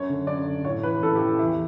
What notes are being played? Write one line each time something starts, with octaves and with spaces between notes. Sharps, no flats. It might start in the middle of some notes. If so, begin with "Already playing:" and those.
Already playing: F#2 C#5
D3
F#2 D5
D3
A2 C#5
E3 B4
A2 A4
G4
E3
E2 E4